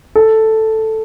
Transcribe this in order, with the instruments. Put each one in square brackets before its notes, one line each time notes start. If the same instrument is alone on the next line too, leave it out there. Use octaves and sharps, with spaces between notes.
[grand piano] A4